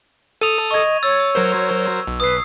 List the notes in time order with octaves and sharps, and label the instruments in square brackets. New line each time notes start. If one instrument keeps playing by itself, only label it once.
[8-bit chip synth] A4 D#6 [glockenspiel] D#7 F7
[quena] D#5 [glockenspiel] C#6 G#6
[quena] C#5 [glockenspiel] E6 [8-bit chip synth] A6
[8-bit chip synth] F#3 A#4 C5
B1
[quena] B4 [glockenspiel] D#6 C7